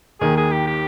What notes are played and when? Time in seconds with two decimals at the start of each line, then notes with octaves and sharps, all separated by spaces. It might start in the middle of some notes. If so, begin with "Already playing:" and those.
0.20 D#2 D#3 G#4
0.37 G#4
0.51 G4
0.67 G4